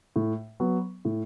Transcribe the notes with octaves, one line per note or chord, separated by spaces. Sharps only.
A2
F#3 B3
A2